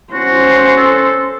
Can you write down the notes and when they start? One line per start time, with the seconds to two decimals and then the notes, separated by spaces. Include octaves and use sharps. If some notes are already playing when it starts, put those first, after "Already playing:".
0.13 C#4 F#4 C5
0.77 A4